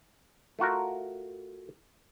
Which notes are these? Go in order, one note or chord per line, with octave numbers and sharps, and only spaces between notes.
A3 F4 F#4 A#4